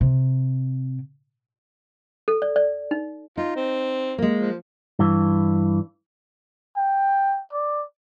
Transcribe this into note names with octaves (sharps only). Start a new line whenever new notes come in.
C3
A4
D5
D5
D#4
D#4 F4
C4
G#3 A#3
F3
G2 E3
G5
D5